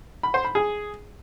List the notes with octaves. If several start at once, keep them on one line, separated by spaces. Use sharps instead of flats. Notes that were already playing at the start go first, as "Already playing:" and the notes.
B5
C5
B5
G#4